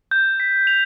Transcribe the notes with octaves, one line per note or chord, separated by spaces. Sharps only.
G6
B6
F7